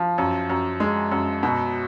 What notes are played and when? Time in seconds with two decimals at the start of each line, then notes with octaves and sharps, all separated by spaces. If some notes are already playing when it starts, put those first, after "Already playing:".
Already playing: F3
0.18 F#2
0.50 F#2
0.80 G#3
1.12 F#2
1.43 B2